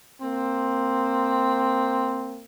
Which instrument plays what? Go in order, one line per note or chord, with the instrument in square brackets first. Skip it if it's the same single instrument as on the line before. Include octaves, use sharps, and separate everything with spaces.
[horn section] A#3 C4